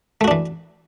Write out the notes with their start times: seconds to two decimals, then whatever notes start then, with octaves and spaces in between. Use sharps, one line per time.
0.21 A3
0.24 F#4
0.28 D4
0.31 E3